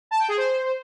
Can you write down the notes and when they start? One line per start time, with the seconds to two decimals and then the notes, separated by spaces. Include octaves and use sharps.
0.11 A5
0.20 G5
0.28 G#4
0.37 C5